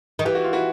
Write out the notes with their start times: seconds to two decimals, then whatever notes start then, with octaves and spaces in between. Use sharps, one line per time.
0.19 D#3
0.25 E3 G4
0.35 F#4
0.44 F4
0.53 E4 F#4